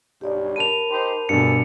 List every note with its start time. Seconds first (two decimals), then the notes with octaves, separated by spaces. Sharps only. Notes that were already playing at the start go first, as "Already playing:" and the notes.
0.21 B1 G2 G4 D5
0.56 A#4 A5 B5 D#7 F7
0.89 D#4 G4 C5
1.29 D2 G2 B2 G#4 A4 C#7